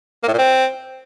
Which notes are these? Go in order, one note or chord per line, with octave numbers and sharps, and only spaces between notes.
A#3
A2
A#2
C4